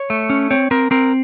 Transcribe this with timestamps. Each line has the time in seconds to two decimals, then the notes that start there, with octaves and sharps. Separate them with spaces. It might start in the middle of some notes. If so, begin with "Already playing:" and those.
Already playing: C#5
0.10 A3
0.30 C#4
0.51 C4 C#5
0.71 C4 A#4
0.91 C4 A#4